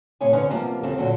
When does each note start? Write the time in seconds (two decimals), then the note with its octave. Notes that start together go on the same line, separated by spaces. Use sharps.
0.21 A2 C3 C#5 D#5 G#5
0.33 F2 D3 C#4 D#4 B4
0.50 C3 F3 G3 A#3 B3
0.83 D#2 C#3 C4 A4
0.97 A#2 D3 F#3 F#4